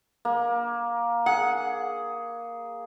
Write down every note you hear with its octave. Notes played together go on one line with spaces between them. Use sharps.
A#3
G#4 F#5